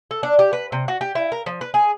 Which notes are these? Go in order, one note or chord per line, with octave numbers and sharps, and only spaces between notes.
A4
D4
G4
B4
C3
F#4
G4
E4
A#4
F3
B4
G#4